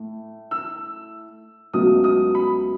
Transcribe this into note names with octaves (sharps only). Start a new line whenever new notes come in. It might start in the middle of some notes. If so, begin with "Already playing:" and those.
Already playing: A2 A3
E6
C#2 B2 F#3 A3 D#6
D#6
B5